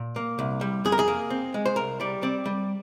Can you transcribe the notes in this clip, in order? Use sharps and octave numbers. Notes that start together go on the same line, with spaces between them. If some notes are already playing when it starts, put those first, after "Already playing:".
Already playing: A#2
A#3
C2
G3
F2 G#4
A#4
G#4
A#3
C4
G#3
C5
C2 A#4
G3 D5
C4 D5
G3